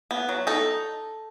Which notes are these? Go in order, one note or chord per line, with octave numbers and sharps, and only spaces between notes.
B3
F#3
D#4 A4